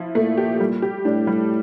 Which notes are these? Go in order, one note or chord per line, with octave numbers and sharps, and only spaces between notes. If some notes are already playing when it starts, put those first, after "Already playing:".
Already playing: F3 E4
A#2 A3
G4
G3
G4
A2 D4
G3